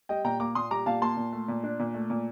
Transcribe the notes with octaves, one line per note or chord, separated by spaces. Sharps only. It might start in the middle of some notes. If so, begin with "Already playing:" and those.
G3 D#5 G5
A#2 G5 A#5
A#3 A#5 D6
A#2 C6 D#6
G3 A#5 D6
A#2 F5 A5
A#3 A5 C6
A#2
A3
A#2
D4
A#2
A3
A#2